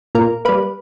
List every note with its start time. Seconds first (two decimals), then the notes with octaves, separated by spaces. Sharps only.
0.15 A#2 A#4
0.45 G3 A#3 B4